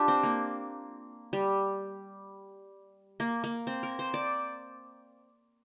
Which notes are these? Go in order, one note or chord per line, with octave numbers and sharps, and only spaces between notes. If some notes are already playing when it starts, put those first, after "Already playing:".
Already playing: D4 F4 G4
C4
A#3
G3
A#3
A#3
C4
A#4
C5
D5